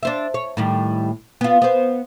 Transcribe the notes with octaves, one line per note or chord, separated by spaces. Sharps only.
D4 C5 E5
C#5
A2 D#3 G3
B3 F4
B3 C5